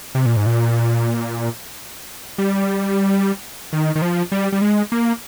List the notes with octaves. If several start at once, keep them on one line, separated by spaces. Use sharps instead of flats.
C3
A#2
G#2
A#2
G3
D#3
D#3
F3
G3
G3
G#3
A#3